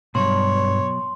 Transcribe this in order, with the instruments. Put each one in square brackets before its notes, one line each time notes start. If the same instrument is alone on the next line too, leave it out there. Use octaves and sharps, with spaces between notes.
[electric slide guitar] G2 [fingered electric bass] B2 F#3 [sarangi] C#5 [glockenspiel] C6